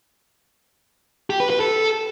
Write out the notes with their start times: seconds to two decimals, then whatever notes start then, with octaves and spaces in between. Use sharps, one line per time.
1.30 G4
1.40 B4
1.50 B4
1.60 A4